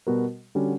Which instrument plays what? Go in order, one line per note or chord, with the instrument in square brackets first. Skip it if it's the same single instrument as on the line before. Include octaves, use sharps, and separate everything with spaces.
[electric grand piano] B2 G3 B3 F#4 A#4
D3 G3 C#4 F#4